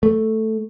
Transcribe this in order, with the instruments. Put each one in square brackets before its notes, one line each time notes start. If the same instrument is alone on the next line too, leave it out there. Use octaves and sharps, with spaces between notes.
[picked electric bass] A3